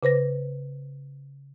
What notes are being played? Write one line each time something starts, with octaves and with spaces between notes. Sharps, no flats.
C#3 B4 C5 A#6